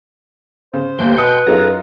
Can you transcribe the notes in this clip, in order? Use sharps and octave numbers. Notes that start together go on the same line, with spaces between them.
C#3 C5
G1 D2 G3 A#3 G5 C6 G6
B2 B4 D#6 C#7
F#2 F#3 D#4 F4 G#4 A4 A#5